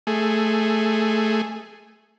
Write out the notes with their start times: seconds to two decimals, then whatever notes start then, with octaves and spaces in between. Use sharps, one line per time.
0.07 A3 G#4